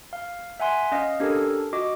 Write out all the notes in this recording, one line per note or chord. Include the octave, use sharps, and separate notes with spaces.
F5
E5 F#5 G#5 C6
C#4 D#5 F5
C#4 D4 G4 A4 A#4
F#4 D#5 D6